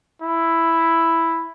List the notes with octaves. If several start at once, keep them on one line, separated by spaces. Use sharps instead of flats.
E4